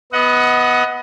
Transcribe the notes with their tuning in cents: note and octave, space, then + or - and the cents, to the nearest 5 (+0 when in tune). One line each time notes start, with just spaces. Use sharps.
B3 +0 D#5 +30 F#5 +0